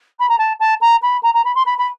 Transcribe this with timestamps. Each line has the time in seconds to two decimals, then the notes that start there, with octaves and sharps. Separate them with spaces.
0.19 B5
0.29 A#5
0.38 A5
0.60 A5
0.81 A#5
1.02 B5
1.23 A#5
1.34 A#5
1.44 B5
1.55 C6
1.66 B5
1.78 B5